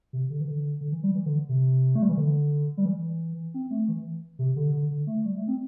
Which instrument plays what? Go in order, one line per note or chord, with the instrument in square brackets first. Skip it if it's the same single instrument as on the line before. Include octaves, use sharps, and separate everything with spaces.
[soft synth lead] C3
D3
E3
D3
D3
E3
G3
E3
D3
C3
A3
G3
E3
D3
G3
E3
C4
A3
E3
C3
D3
D3
D3
A3
G3
A3
C4